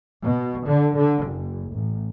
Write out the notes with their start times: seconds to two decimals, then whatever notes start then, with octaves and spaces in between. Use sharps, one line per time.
0.24 B2
0.66 D3
0.96 D3
1.25 F#1
1.73 A1